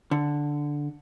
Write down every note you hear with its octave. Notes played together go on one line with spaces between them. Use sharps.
D3